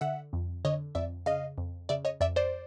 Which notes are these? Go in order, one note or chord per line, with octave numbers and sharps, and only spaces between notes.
D3 E5 F#5
F2
D3 C#5 D#5
F2 D5 E5
C#3 D#5 F5
F2
C#3 D5 E5
C#5 D#5
F2 D5 E5
C5 D5